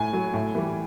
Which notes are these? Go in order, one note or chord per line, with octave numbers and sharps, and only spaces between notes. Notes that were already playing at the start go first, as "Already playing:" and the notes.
Already playing: A2 G#5
F#3
A2
E3 G3